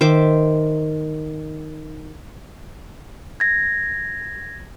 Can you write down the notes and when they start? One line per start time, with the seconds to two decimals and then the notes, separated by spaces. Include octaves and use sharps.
0.01 D#3 C5 E5 D6
3.40 G#6 A#6